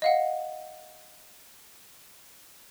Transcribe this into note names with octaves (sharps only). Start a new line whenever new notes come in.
D#5 F5 F#5